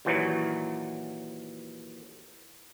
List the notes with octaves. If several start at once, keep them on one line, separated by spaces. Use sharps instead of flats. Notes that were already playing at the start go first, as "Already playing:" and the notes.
D#2 A#2 E3 F#3